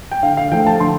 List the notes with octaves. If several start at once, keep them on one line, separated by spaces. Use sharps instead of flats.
G5
D3 F5
F5
F3 A3 G5
A5
D3 C6